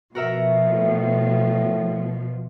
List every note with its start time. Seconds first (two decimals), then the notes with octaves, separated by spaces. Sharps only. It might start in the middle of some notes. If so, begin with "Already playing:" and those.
0.15 B2 F3 F#4 A#4 E5
0.69 A2